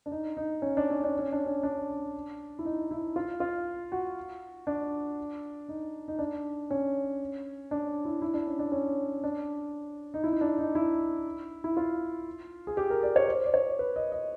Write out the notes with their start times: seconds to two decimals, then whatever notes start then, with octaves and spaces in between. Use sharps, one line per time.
0.06 D4
0.11 D#4
0.37 D#4
0.62 C#4
0.77 D4
0.90 C#4
1.04 D4
1.19 C#4
1.32 D4
1.46 C#4
1.63 D4
2.59 E4
2.65 D#4
2.91 E4
3.16 F4
3.40 F4
3.92 F#4
4.67 D4
5.69 D#4
6.08 D#4
6.19 D4
6.70 C#4
7.71 D4
8.05 E4
8.22 E4
8.34 D4
8.47 C#4
8.59 D4
8.72 C#4
9.24 D4
10.14 D#4
10.24 E4
10.32 D#4
10.41 D4
10.59 D#4
10.75 E4
11.64 E4
11.77 F4
12.67 G#4
12.77 G4
12.90 A#4
13.03 D5
13.16 C#5
13.28 C5
13.46 D5
13.54 C#5
13.79 B4
13.96 D#5
14.12 D#5